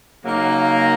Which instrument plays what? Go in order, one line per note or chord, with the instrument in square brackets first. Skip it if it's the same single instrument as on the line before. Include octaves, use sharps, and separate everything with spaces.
[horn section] C#3 F#3 A#3 D#4